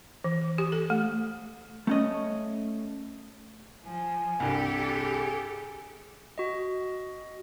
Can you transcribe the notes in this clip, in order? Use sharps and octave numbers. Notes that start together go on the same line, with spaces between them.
E3
G4
A4
A3
A3 C#4 D#5
F3 G#5
C2 G2 G4 A4
G#4
F#4 D#5